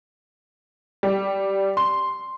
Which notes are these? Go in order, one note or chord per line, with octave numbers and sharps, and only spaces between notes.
G3
C6